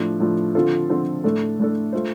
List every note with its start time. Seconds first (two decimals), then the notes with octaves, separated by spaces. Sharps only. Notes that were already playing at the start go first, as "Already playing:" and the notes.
Already playing: A2 F3 D4
0.20 A2 F3 D4
0.55 D3 F3 C4 F4 A4
0.90 D3 F3 C4 F4 A4
1.24 A2 A3 D4 A4
1.59 A2 A3 D4 A4
1.93 A3 F4 C5